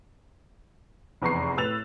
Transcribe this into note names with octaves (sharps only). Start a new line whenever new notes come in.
F1 E2 B4 A#5 C#6 C7
A2 B4 E6 F#6 A6 F7